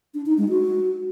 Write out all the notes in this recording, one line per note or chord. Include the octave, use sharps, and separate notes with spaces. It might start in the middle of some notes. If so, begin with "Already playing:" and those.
D4
D#4
G#3
F#4